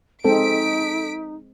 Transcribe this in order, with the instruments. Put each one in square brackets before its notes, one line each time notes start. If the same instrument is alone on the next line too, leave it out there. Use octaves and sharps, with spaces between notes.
[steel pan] G#3 C4 [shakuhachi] D#4 [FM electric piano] A4 [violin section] B6 D7